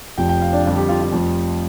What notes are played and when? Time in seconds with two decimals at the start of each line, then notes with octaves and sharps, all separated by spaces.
0.17 F1 F2 F3 G5
0.29 G5
0.41 F5
0.53 D4
0.65 F2 D3 G3 F4
0.76 G4
0.89 F4
1.01 F4
1.12 F1 F2 F3